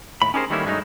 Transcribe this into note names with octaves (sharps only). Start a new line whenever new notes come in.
D#2 A2 B5
C#4 D#4 G4 G#4 A#4 C5
D#3 G3 A3 A#3 C#4 E4
G2 F#3 G#3 A3 C#4 D#4